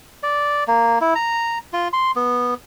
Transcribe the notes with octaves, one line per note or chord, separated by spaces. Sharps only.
D5
A#3
E4
A#5
F4
C6
B3